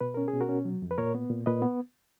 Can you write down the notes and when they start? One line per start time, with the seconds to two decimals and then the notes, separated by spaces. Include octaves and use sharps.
0.01 B2 B4
0.14 C#4 A#4
0.28 G#4
0.33 B2
0.41 F#4 A#4
0.49 C#4
0.65 F#3
0.82 F2
0.91 B4
0.98 A#2 A#4 C#5
1.15 B3
1.30 A#2
1.46 A#2 B4 D#5
1.62 B3